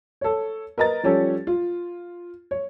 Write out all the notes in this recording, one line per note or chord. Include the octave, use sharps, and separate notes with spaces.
A4 C#5
A#4 B4 D#5 A#5 A6
F3 G3 C#4 G4 A4 C#5
F4
C#5